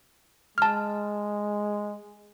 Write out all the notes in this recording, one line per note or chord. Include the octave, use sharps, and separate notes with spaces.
G#3 A5 F6